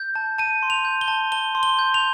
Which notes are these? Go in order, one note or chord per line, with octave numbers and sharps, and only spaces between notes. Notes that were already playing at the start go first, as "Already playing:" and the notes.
Already playing: G6
A5
A5 D#7
C6
F7
G6
G7
A5
A5 G7
C6
G7
G6
F7